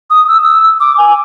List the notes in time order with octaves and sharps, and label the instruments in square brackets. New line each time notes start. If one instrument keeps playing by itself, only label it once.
[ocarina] D#6
E6
E6
D6
G#5